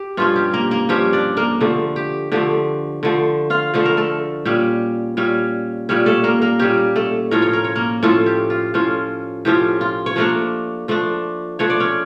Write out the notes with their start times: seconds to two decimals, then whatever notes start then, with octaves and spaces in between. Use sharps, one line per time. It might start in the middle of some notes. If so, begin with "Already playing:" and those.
Already playing: G4
0.17 G2 F3 C#4 F4
0.36 G4
0.54 A#3 A#4
0.71 A#3 A#4
0.89 G2 F3 C#4 G4
1.13 D4 D5
1.37 A#3 A#4
1.61 D3 F3 A3
1.96 G4
2.32 D3 F3 A3 G4
3.03 D3 F3 A3
3.50 F4 F5
3.74 D3 F3 A3 A4
3.85 A#4
3.97 A3 A4
4.45 A#2 G3 C#4 G4
5.17 A#2 G3 C#4
5.89 A#2 G3 C#4 G4
6.06 A3 A4
6.24 A#3 A#4
6.42 A#3 A#4
6.59 A#2 G3 C#4 G4
6.96 A3 A4
7.31 A2 F3 C#4 F4 A#4
7.42 C#5
7.53 A#4
7.64 C#5
7.76 A#3 A#4
8.03 A2 F3 A3 C#4 F4 A4
8.26 G4
8.50 F4
8.74 A2 F3 C#4 F4
9.45 A2 F3 C#4 F4 G4
9.81 F4
10.06 C#5
10.16 F3 A3 A#3 D4 A#4
10.88 F3 A3 D4
11.59 F3 A3 D4 C#5
11.70 D5
11.80 C#4 C#5